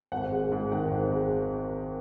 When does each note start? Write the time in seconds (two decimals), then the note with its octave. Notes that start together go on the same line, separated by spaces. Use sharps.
0.12 G#1 F#5
0.32 G#3
0.52 G#2
0.72 D#3 F#5
0.91 G#1
1.12 G#3